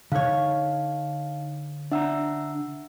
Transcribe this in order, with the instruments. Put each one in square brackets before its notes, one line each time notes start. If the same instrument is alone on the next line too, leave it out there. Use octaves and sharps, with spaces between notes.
[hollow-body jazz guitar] D3 C#5 [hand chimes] D#4 F5
[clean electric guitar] D4 A#5 [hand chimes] E5 F#5 E6